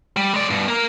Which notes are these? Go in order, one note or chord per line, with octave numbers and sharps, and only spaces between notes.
G3
G#3 D5
G2 B2
A#3 A#4